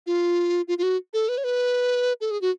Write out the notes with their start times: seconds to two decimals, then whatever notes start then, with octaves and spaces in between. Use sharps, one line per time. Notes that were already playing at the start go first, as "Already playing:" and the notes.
0.06 F4
0.68 F4
0.78 F4
0.83 F#4
1.13 A4
1.29 B4
1.38 C#5
1.44 B4
2.21 A4
2.31 G#4
2.41 F#4